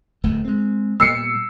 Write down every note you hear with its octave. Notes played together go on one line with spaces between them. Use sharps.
D1 E2 A3
G#3 C4
A#2 G3 B3 E6 C7 C#7